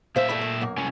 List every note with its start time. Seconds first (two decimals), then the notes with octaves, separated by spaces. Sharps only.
0.16 A#2 C5 E5 F5
0.29 G2 A3 B5
0.41 A3
0.61 B1 F#2 A#3
0.78 C2 C#4